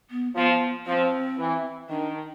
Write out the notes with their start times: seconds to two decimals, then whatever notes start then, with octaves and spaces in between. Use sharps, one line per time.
0.10 B3
0.35 F3 B3
0.86 F3 C4
1.38 E3
1.89 D#3 D4